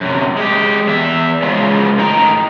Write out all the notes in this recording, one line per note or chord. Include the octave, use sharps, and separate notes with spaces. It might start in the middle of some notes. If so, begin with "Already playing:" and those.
F#2 C3
G#3 G4
E2 E5
C#3 F3 F#3 G#3 F4
A2 D#4 G5 A#5